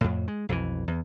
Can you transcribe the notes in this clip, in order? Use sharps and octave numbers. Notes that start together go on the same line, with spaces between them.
F2 A2
G#3
B1 F2 D#3 E3
E2